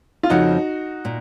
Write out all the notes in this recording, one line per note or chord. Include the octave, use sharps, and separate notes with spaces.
F4
F2 C#3 F3 D#4 F#4
A#2